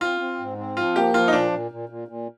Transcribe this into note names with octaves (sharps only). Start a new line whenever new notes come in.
C4 F4
C4
G#2
C4
F3 F4
A#3 G4
F3 F4
D#4
A#2 D4
A#2
A#2
A#2
A#2